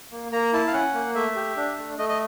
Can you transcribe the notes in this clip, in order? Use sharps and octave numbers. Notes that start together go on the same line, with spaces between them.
A#3
A#3 A#5
E4 A5
F5
C#4 F#5
A#3
A3 E5
G4
D4
A3
A3 D#5
D#5